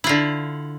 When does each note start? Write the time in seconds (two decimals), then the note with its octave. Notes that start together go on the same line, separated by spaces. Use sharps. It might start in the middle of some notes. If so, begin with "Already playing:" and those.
0.04 E4
0.07 F4
0.09 D3